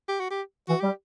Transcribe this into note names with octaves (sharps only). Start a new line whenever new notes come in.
G4
F#4
G4
E3 F#4
G3 G4